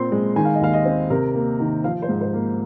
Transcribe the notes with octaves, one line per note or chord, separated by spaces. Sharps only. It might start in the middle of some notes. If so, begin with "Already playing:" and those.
Already playing: A#2 A#3 C4 C6
G#3
D#3 G#5
F5
D#5
D#2 F5
D#5
C4
C3 A#4
A#3
D#3
F3 F5
C5
G#2
C5
A#3